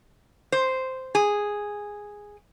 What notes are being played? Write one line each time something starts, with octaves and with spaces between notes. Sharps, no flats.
C5
G#4